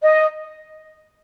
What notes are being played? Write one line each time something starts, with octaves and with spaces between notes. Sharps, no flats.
D#5